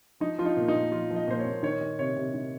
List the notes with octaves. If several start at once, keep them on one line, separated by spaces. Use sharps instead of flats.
F3 D#4
F3 F4
D#4
A#2
D#4
A#2
F3 F4
F3
D#5
A#2 C5
C#5
A#2
D#3 C#5
D#3
C3 C#5
C3
D#3